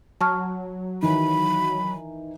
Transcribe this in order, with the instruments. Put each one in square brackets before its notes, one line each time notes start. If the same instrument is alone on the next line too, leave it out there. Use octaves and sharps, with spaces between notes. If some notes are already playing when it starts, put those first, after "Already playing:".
[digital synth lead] F#3 [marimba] A5 C#6 F6
[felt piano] D#3 E3 [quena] B5